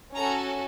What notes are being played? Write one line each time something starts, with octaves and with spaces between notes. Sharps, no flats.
C#4 F#4 A4 A#5